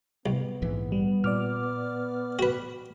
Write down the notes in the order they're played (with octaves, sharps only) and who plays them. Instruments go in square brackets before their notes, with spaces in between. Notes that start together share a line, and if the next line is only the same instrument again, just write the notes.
[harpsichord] C2 [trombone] B3
[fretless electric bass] A#1 G#2 E3
[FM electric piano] G3
[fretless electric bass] A#2 [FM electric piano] D5 D6 F6
[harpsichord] F#4 B4